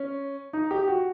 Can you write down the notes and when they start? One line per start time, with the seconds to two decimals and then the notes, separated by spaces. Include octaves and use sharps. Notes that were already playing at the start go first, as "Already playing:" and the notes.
Already playing: C#4
0.53 D#4
0.71 G4
0.88 F#4